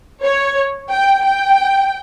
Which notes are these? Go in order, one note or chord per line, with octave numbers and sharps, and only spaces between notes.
C#5
G5
G5